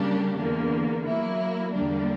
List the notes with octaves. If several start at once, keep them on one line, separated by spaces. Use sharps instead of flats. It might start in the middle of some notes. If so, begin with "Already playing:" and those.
Already playing: C#3 G3 A#3 D4 G4
E2 D3 A#3
F#3 A#3 E4
E2 D3 G3 A#3 D4